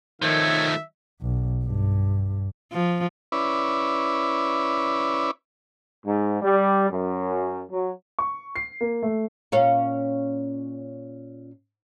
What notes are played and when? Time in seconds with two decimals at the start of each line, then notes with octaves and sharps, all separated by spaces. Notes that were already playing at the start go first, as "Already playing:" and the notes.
0.22 D#3 F3 A3 C#5 E5
1.21 B1
1.64 G2
2.73 F3
3.32 C#4 E4 B4 D5
6.05 G#2
6.41 G3
6.90 F#2
7.71 F#3
8.19 C#6
8.56 C7
8.81 A#3
9.03 A3
9.52 A#2 C#4 F5